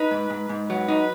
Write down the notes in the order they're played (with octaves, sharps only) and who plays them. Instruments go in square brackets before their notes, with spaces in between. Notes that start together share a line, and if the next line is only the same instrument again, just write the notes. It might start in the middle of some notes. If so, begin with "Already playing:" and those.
Already playing: [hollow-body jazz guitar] D#4 [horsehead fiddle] B4
[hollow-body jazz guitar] G#2
G#2
G#2
[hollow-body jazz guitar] F#3 [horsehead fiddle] B4
[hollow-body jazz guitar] D#4